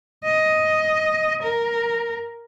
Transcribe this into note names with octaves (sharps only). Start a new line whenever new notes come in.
D#5
A#4